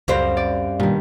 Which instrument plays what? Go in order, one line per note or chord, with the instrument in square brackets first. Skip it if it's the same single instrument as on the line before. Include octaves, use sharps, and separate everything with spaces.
[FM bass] C#2 [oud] F#2 G3 C4 [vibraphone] F5
[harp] D5
[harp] G2 D#3 [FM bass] A#2